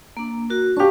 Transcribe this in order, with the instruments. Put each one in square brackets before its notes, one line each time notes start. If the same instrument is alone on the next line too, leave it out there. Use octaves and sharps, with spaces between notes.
[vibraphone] A#3 D4
F#4 A#4
[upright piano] D4 G4 [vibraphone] F5 C#6